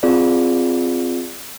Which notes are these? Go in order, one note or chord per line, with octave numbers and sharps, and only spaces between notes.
C4 F4 G#4 D5